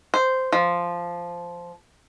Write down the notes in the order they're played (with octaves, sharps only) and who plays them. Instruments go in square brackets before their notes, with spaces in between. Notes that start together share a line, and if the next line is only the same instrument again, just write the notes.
[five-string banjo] C5
F3